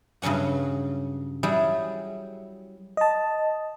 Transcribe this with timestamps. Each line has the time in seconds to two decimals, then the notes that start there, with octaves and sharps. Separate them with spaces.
0.22 G2 C#3 F#3 C#4 F#4
1.43 F#3 G3 E4 G#4
2.97 D#5 A5